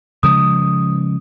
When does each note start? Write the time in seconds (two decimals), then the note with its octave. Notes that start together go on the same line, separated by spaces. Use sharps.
0.23 C#3 F3 G#3 D#6